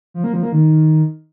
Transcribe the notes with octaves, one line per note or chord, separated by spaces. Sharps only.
F3
A#3
F3
A#3
D#3